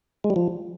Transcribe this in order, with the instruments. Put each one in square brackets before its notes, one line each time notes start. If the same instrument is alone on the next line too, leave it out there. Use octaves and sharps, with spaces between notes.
[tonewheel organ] G#3
G3
F3